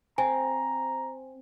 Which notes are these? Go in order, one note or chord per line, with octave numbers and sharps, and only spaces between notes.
C4 G#5 A#5